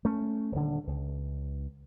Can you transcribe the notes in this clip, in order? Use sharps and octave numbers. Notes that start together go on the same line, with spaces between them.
A3 C#4
D#1 D3
C#2